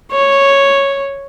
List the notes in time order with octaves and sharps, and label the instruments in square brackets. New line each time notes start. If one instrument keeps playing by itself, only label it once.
[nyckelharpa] C#5